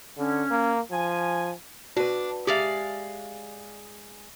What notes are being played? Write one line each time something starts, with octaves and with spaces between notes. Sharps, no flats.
D3 C#4
A#3
F3 G#5
D4 F#4 B4
G#3 G4 D5 E5 F5